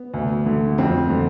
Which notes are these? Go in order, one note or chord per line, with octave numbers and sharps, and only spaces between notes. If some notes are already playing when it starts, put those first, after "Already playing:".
Already playing: B3
D2
D3
F2 C4
D3